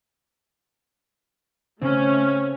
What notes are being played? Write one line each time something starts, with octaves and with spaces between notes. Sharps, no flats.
C#3 A3 C4 C#4